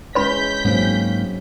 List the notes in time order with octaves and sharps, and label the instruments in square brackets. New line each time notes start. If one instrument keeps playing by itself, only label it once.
[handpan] G#3 C#4 E4 [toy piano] B4 B5 [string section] G6 B6
[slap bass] G#2 A#3 [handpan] F#3 C4 C#4